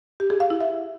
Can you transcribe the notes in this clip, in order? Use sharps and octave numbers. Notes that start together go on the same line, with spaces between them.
G4
G#4
F5
E4
E5